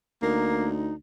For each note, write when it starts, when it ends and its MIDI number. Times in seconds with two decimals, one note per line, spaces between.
0.22 0.93 38
0.22 0.72 58
0.22 0.95 63